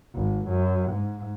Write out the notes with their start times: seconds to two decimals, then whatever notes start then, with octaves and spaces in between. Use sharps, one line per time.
0.14 G#1
0.48 F#2
0.91 G#2